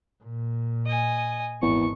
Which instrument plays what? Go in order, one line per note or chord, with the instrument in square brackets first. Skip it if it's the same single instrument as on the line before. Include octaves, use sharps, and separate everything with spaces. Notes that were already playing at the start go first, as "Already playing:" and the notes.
[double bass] A#2
[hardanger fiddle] D#5 G#5
[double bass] G#1 [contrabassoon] E2 [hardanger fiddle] C#6